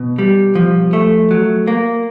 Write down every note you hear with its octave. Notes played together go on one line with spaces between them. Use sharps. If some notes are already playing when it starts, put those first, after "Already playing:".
Already playing: B2
G3
F3
A3
F#3
A#3